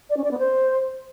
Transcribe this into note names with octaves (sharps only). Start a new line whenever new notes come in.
D5
C#4
D5
B3
C5